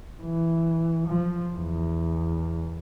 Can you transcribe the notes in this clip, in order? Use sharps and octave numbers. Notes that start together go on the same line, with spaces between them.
E3
F3
E2